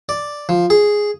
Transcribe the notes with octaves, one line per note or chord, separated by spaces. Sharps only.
D5
F3
G#4